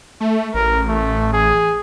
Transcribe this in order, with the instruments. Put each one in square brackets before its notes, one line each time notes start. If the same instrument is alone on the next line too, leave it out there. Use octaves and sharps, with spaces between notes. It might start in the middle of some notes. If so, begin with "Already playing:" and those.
[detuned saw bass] A3
[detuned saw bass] A1 [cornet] A#4
[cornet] A3
G#4